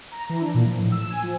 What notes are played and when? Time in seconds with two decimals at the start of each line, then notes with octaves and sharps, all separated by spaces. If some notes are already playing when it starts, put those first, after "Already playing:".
0.12 A#5
0.29 E3
0.42 D4
0.54 A#2
0.66 F3
0.80 A2
0.92 E6
1.10 G#5
1.23 F3